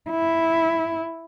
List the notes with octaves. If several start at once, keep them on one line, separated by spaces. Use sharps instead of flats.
E4